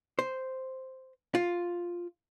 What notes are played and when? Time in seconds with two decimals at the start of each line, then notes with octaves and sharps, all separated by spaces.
0.19 C5
1.35 F4